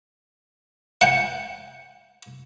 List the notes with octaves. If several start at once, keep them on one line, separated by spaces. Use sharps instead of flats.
F#5 G5